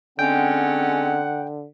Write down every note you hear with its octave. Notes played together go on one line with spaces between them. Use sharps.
D3 G#3 C4 C#4 F#5 G5